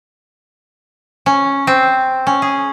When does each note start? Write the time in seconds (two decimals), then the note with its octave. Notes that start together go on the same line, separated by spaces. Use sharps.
1.26 C#4
1.67 C4
2.27 C#4
2.42 G#4